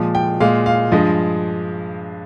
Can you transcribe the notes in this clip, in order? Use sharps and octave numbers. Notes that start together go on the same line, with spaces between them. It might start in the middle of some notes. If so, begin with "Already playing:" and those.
Already playing: A#2 F3 G#3
G5
A#2 G#3 F5
F5
G2 F3 G#3 D#5